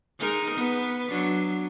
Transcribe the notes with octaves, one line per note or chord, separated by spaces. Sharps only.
G#3 D#4 A#4
B3 B4
F#3 D4